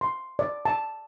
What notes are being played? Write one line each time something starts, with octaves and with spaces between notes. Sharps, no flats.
C6
D5
A5